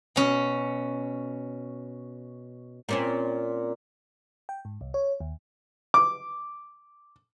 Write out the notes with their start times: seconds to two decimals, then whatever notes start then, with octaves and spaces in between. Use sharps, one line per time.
0.16 B2 C#4
2.89 A#2 C4 C#4
4.49 G5
4.65 G#2
4.81 C2
4.94 C#5
5.20 D#2
5.94 D6